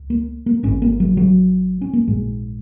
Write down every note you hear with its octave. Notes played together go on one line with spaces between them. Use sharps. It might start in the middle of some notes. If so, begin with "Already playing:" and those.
Already playing: C#2
A#3
A#3
G#1 G#2 C#4
A#3
F#3
F#3
C#4
A#3
A#1 G#2 G#3